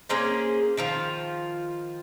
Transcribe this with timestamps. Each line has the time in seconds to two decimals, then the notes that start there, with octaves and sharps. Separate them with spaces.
0.09 A#3 C#4 G#4 C5
0.77 D#3 F3 F4